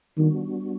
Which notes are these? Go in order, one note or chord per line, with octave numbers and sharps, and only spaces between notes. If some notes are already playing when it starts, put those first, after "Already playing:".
D#3 G3 B3 D4 F#4